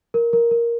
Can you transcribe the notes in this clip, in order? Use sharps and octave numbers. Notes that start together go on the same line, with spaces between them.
A#4
A#4
A#4